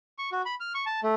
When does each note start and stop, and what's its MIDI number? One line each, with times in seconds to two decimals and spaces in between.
0.18 0.30 85
0.32 0.42 66
0.46 0.55 83
0.60 0.73 89
0.75 0.85 85
0.86 1.00 81
1.03 1.15 57